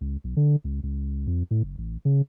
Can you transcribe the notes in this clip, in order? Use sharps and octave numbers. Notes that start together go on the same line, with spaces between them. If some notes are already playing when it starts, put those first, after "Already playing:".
C#2
B1
D3
C#2
C#2
F2
A2
F#1
A1
C#3